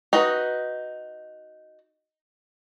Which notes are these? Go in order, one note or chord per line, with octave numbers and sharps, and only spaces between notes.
D#4 F#4 B4